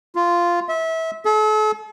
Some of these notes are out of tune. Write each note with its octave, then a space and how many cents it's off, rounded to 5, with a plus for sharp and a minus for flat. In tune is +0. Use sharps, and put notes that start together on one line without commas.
F4 -10
E5 -25
A4 -40